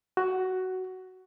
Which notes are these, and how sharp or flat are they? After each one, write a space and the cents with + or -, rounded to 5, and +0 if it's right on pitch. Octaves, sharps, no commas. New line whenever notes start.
F#4 +10